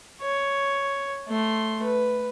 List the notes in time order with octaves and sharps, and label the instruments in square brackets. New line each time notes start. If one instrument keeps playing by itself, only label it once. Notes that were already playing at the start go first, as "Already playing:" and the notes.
[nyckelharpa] C#5
A3 C6
B4